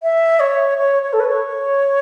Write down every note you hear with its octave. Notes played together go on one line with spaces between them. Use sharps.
E5
C#5
C#5
C#5
A4
B4
C#5